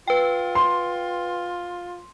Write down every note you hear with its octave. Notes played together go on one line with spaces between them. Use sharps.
F4 B4 G5
C6